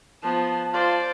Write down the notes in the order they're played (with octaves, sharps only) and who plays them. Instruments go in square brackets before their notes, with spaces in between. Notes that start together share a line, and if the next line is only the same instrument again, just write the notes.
[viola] F3 B3 [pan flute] A5
[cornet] F4 [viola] C5 D5